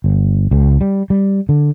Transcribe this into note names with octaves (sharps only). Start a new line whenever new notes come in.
G1
C#2
G3
G3
D3